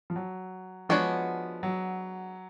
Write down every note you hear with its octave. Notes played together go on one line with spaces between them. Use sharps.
F3
F#3
F3 G#3 B3 D4 F#4 C#5
F#3